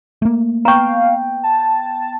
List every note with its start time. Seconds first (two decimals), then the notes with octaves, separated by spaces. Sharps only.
0.22 A3 A#3
0.65 B3 F5 G5 A#5 C#6
1.43 A5